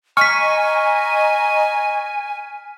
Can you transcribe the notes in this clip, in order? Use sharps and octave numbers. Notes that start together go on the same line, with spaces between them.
D#5 G#5 A#5 C#6 F6 B6